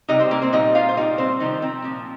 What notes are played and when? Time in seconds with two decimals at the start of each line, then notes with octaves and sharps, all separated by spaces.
0.09 C3 G3 D#4 D#5
0.19 C4 C5
0.31 A#3 A#4
0.42 C4 C5
0.53 A#2 G3 D#4 D#5
0.75 F4 F5
0.89 C5
0.97 A#2 G3 D#4 D#5
1.18 C4 C5
1.40 C3 D#3 F3 D#4
1.62 C4
1.84 A#2 F3